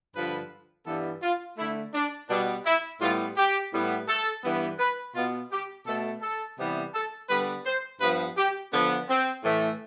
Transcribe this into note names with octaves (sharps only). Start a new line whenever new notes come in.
G2 D3 F3 B4
G2 E3 G3 B3 A4
F4
D3 A3 E4
D4
B2 G3 B3 D4
E4
A2 G3 B3 F4
G4
A2 G3 B3
A4
G2 E3 G3 B3
B4
B2 B3 F4
G4
B2 A3 A4
A4
C3 E3 G3 B3
A4
D3 G3 B3 B4
C5
G2 F3 B3 B4
G4
D3 F3 B3
C4
A2 E3 A3